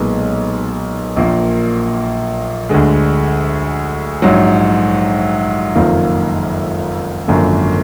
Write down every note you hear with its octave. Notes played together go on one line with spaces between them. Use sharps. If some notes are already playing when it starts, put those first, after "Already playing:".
Already playing: B1 A#2 G#3 B3 D#4
A#1 A#2 F3 A#3
D2 D3 G#3
A#1 G#2 F#3
F#1 F2 D#3 A#3 F4
G#1 F#2 D3 F3 A#3